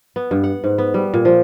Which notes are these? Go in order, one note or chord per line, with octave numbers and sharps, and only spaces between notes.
B3
G2
F#5
G#2
B3
G3
A#2
F3